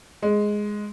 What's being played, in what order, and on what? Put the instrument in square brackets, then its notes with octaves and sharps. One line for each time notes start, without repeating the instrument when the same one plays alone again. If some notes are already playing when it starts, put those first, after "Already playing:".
[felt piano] G#3